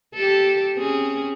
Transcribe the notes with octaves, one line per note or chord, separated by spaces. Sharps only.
G4 A4
C4 C#4 G#4